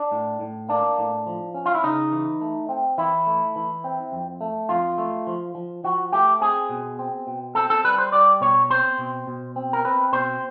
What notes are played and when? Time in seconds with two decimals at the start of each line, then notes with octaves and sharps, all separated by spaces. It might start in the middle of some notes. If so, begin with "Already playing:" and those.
Already playing: D4
0.12 A2
0.40 A2
0.69 A#3 D4
0.98 A2
1.27 F3
1.54 C#4
1.66 F4
1.75 E4
1.83 C#3 D#4
2.12 E3
2.41 A3
2.69 C4
2.98 E3 E4
3.27 A3
3.56 E3
3.84 C4
4.12 F2
4.41 A3
4.69 F2 F4
4.98 A3
5.27 F3
5.55 F3
5.84 F3 F#4
6.12 A3 G4
6.41 C4 G#4
6.69 B2
6.99 C4
7.27 B2
7.55 C4 A4
7.70 A4
7.84 G3 B4
7.98 C5
8.12 G3 D5
8.41 B2 C#5
8.70 C4 C5
8.99 B2
9.27 B2
9.56 C4
9.73 A#4
9.85 C4 B4
10.13 B2 C5